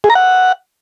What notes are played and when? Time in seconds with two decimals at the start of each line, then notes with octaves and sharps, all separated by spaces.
0.04 G#4
0.10 A#5
0.15 F#5